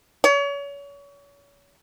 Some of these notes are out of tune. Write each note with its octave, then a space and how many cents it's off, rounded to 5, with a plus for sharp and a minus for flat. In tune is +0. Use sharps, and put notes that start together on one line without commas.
C#5 +35